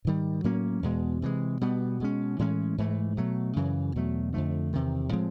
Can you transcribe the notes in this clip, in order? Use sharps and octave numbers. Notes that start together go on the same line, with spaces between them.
G#2 D#3 G3
A2 F#3 A#3 C#4
E2 B2 G#3
C3 E3 G#3
B2 G3 B3
B2 G#3 C#4
A2 E3 G#3 C#4
G#2 E3 A3
B2 F#3 A3
F#2 C#3 E3
E2 B2 F#3 A3
F2 D3 F3 A3
E2 C3 D#3
A2 F3 G#3 C4